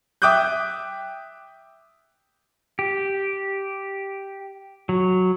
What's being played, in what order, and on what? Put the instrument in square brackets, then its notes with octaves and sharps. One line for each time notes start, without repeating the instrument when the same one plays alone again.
[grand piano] E5 G5 D6 D#6 F#6 G6
[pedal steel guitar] G4
F#3